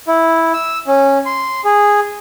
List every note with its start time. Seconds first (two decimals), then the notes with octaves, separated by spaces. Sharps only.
0.08 E4
0.54 E6
0.87 C#4
1.26 C6
1.65 G#4